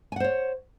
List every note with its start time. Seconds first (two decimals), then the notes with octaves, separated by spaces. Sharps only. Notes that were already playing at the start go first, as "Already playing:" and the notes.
0.12 G#5
0.16 F#5
0.20 C5
0.24 C#5